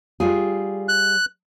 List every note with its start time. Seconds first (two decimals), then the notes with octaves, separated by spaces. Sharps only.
0.20 G3 F4 G#4
0.88 F#6